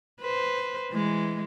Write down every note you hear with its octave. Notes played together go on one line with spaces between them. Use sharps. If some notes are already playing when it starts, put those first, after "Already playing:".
B4 C5
E3 G#3